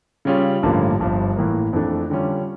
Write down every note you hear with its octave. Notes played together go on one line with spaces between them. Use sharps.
C#3 G3 C#4 F4
A1 G2 D3 F3 A#3
G1 G2 F3
A2 E3 A#3
F2 E3 A3 D4 A4
D3 G3 C#4 F4